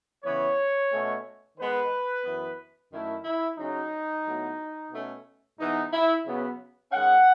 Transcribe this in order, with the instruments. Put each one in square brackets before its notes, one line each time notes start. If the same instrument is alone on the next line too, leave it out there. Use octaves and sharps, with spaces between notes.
[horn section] C#3 E3 B3 C#5
B2 A3 C#4
D#3 G#3 B3 B4
F#2 E3 B3
F#2 D#3 A3 C#4 E4
E4
C#3 F#3 C#4 D#4
A2 F#3 B3
B2 A3 C#4
G#2 E3 B3 D#4
E4
C#3 F#3 B3
D#3 G#3 C#4 F#5